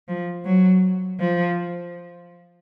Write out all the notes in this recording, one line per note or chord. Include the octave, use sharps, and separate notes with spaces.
F3
F#3
F3